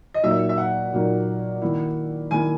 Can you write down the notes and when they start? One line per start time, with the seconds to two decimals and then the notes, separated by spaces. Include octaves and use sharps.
0.14 D#5
0.23 A#2 F#3 A#3 D#4 E5
0.49 E5
0.58 F#5
0.93 A#2 F#3 A#3 D#4
1.62 D#3 A#3 E4
2.31 D#3 A#3 E4 G#5